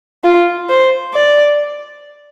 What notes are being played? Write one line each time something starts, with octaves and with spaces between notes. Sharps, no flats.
F4
C5
D5